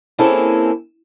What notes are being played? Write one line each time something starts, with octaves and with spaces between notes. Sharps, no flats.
A#3 C4 C#4 E4 G#4 A4